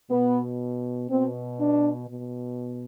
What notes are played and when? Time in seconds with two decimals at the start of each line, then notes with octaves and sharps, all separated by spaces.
0.10 B2 B3
1.09 B2 C4
1.60 D4
2.09 B2